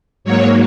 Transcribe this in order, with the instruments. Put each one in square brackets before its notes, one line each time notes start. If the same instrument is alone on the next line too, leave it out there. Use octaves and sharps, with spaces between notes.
[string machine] G#2 F#3 A#3 C#5